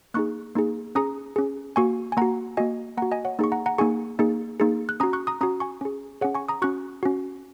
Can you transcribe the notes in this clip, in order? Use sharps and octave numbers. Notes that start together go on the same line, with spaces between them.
A#3 D#4 G#4 C#6 F#6
A#3 D#4 G#4
C#4 G#4 A#5 D#6
C#4 G#4
A#3 F#4 G#5 C#6
G#5
A#3 F#4 F#5 A#5
A#3 F#4 D#5 G#5
A#3 F#4 F#5 A#5
D#5 G#5
C#5 F#5
A#3 D#4 G#4 C#6
F#5 A#5
F#5 A#5
A#3 D#4 G#4 G#5 C#6
A#3 D#4 G#4
A#3 D#4 G#4
F#6
C#4 F#4 A#5 D#6
C#6 F#6
A#5 D#6
C#4 F#4 A#5 D#6
G#5 C#6
C#4 G#4
C#4 G#4 C#5 F#5
G#5 C#6
A#5 D#6
C#4 F#4 C#6 F#6
C#4 F#4